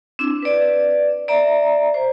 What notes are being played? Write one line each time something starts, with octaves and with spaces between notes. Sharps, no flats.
C4 D4 E4
B4 D5
D5 E5 A#5
C5